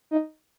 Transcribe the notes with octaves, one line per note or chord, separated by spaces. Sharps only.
D#4